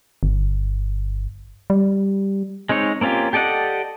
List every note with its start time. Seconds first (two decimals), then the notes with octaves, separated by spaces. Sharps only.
0.23 G1
1.70 G3
2.69 G#3 C4 D#4 C#5
3.01 A#3 C4 C#4 F4 G4
3.33 G4 A4 D5 D#5 F#5